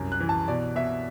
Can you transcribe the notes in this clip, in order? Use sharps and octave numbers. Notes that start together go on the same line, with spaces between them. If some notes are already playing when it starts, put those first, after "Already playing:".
Already playing: C2 F#2
F#6
E3
A5
B2 D5
B2 E5